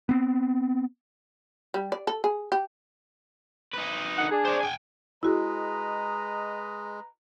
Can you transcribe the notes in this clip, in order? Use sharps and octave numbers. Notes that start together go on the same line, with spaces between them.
B3 C4
G3
D5
A4
G#4
G4
D#4 B4
D3 D#3 F#5
D4 G#4
C5 D5
G5 G#5
G#3 E4 F#4 G#4 B4 D#5 A#5